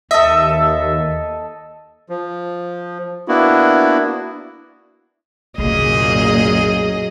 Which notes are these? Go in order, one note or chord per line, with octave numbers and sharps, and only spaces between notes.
D#2 A4 D#5 E5
F3
A#3 B3 D4 E4 F#4
C2 F#2 A#2 D3 G#4 D#5